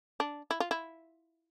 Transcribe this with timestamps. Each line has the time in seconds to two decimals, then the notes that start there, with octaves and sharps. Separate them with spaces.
0.20 D4
0.51 E4
0.60 F4
0.71 E4